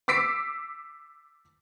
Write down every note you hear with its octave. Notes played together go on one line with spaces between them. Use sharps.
D6 E6 B6 C7 D7